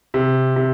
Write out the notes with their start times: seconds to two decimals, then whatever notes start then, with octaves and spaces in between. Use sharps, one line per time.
0.14 C3
0.56 C3